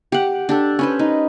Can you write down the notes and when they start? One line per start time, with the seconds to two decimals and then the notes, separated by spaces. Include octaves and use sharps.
0.12 G4 F#5
0.49 D4 G4 A4
0.79 C#4 B4 C5
0.99 D#4